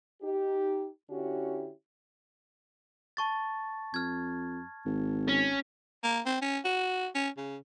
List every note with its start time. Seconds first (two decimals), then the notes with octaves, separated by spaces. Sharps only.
0.21 D#4 G4
1.10 D3 C#4 E4 F#4 G4
3.17 A5 C#6 A6
3.94 F2 F6 G#6
4.86 G#1
5.29 C#4
6.04 A#3
6.26 C4
6.42 C#4
6.65 F#4
7.15 C#4
7.37 C#3